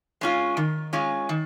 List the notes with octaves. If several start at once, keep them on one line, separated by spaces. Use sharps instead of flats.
G#3 C#4 F4
D#3
G#3 C#4 F4
D#3